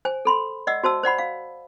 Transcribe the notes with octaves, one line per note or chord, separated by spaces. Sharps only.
C5 G#5
A4 B5 C6
D5 D#5 F#5 E6
F#4 C5 A5 E6
C5 D5 F#5 B5
F5